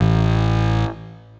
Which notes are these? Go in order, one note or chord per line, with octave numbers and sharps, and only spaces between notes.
A1